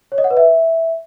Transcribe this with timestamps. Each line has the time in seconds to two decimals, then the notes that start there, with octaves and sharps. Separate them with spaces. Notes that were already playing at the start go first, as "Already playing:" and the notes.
0.12 C#5
0.18 D#5
0.24 F#5
0.30 B4
0.37 E5